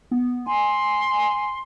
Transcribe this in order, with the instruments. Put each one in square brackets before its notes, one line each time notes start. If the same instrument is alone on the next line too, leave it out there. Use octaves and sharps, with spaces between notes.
[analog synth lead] B3
[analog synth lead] G#5 [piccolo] C6